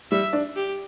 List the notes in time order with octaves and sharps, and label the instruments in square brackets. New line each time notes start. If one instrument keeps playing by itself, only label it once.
[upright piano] G3 [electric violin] E5
[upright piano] D4
[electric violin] G4